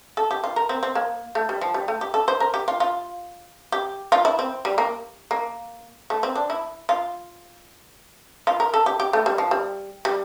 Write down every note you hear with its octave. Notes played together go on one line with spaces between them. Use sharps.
A4
G4
F4
A#4
C4
C4
A#3
A3
G3
F3
G3
A3
G4
A4
C5
A#4
G4
F4
F4
G4
F4
E4
C4
G3
A#3
A#3
A3
C4
D4
E4
F4
F4
A#4
A4
G4
G4
A3
G3
F3
G3
G3